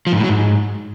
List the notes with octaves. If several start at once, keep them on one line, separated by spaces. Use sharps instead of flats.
F3
G#2
A2
F#3
G#2